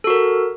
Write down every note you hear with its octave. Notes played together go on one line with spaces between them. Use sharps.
F#4 A4 A#4